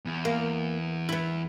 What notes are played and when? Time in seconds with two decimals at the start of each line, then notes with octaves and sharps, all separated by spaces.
0.05 E2
0.25 A#3
1.09 B3 E4